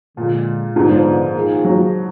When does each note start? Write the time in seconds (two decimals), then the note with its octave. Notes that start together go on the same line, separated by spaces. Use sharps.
0.17 A#2 D3 F3 G#3
0.75 G#2 D3 G#3 B3 D4
0.91 F3
1.06 F3
1.35 D#3 A#3 F4 G#4
1.65 F#3